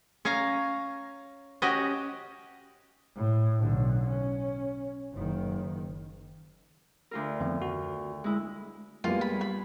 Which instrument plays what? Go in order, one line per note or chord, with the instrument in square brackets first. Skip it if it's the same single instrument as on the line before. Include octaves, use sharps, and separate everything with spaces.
[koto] C#4 C#5 F5 A#5
C#4 F#4 G4 D#5
[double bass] A2
B1 D3
C#4
F#1 D#3
[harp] D2 F4 A#4
[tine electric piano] F2 D#3 B3
F#4
[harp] G#3 E4
[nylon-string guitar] G3 G#3 [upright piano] A#3 B3 [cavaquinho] F4
[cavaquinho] B5
B5